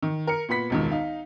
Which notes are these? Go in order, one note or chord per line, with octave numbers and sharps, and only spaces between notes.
D#3
A#4 C#7
A#2 B3 B5 B6
E1 C#2 D#3
D#4 F5